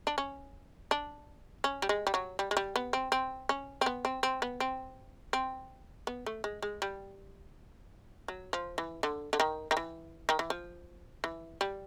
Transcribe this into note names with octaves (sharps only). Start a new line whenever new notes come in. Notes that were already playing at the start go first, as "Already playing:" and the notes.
D4
C#4
D4
C#4
G3
G#3
G3
F#3
G3
G#3
G3
B3
C4
C4
C#4
C4
B3
C4
C4
B3
C4
C4
B3
A3
G#3
G#3
G3
F#3
F3
E3
D3
D3
D#3
D#3
E3
D#3
E3
F3
E3
G3